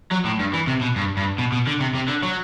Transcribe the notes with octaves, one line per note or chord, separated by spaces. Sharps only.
F#3
A2
G2
E3
C3
B2
G2
G2
B2
B2
D3
C3
C3
D3
F#3